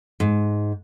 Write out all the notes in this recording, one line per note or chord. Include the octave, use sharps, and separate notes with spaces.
G#2